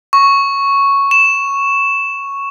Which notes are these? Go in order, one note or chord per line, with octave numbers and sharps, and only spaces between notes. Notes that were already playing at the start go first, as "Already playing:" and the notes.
C#6
E7